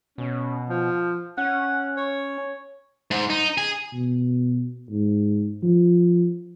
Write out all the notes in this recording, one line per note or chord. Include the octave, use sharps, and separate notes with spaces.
B2 C#4
F3
C#4 F#5
C#5
G#2
D#4
G#4
B2
G#2
F3